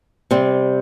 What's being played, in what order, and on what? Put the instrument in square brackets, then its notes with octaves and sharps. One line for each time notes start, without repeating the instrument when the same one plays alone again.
[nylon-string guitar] C3 G3 C4